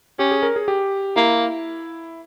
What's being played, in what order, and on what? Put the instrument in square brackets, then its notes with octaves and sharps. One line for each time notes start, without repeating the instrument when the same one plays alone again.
[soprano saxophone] C#4 [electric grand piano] G4
[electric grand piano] G#4
A#4
G#4
G4
[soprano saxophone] A#3 [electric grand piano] E4